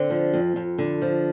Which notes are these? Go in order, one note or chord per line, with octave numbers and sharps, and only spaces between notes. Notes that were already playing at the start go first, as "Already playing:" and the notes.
Already playing: D3 C4
F3
F2
F2
D3
F3